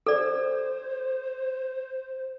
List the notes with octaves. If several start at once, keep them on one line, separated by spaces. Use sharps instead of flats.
A4 C5 D5